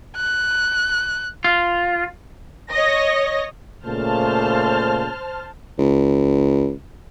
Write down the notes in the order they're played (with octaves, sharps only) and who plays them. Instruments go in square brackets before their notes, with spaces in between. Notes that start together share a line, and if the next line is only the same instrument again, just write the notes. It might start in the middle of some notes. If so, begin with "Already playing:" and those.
[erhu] F#6
[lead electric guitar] F4
[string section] C#5 D#5 A#6
[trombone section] A#2 C#3 A3 [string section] C5 A5 F6
[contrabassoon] C#2